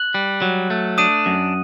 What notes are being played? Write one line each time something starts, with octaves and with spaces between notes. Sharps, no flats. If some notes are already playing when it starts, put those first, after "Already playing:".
Already playing: F#6 F#7
G3
F#3
A3
D4 D#6 D#7
F#2